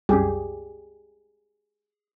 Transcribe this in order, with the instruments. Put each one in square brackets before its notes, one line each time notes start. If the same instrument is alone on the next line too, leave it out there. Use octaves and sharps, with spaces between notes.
[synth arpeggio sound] C2 F#2 [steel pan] G4 G#4